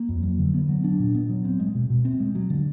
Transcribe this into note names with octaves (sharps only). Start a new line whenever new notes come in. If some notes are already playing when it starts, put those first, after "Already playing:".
Already playing: A#3
F2
F#3
D3
B3
F#3
D4
A#2
B3
F#3
C4
G#3
B2
B2
C4
G#3
F#3
D3